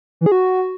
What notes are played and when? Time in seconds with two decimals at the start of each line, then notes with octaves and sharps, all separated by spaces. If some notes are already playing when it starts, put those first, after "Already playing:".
0.21 E3
0.26 G#4
0.32 F#4